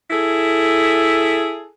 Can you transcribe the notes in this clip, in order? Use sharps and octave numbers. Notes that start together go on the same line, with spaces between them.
E4 G#4 A4